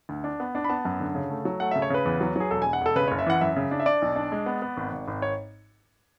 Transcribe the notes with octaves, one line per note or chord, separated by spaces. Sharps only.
D2
D4
B3
D4
B5
B3 A5
F#2
D3
C#3
A3
F#3
A3 F#5
C#3 E5
C#5
C#3 B4
E2
F#3
F#3 G#4
E1 A4
E1 G#5
F#5
E1 A4
C#3 B4
F#1 C#5
E5
E3 F#5
F#2 E5
C#3
D4
E5
D4 D5
B1
D4
G#3
B3
B3
G#1
G#1
G#1
C#5